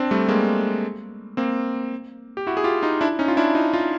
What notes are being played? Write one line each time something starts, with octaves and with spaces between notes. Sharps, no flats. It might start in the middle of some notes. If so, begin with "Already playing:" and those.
Already playing: C4 D4
G3 A3
G#3 A#3
A#3 C4
G4
E4 F#4
G#4
F4 G4
D#4 F4
D4 E4
C#4 D#4
F4
D4 E4
D#4 F4
D#4 F4